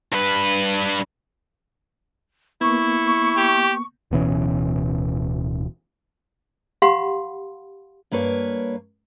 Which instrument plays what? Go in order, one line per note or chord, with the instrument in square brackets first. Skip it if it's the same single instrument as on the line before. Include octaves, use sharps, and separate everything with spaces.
[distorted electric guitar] G2 B4
[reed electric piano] A#3 B3 [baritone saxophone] E4 [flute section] C#6
[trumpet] G4
[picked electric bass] D1 B2 E3 C#4
[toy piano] G4 F5 F#5 B5 C6
[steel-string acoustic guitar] G2 A#3 B4 C#5